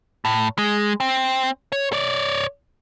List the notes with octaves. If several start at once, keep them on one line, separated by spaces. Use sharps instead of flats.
A2
G#3
C4
C#5
C#5 D5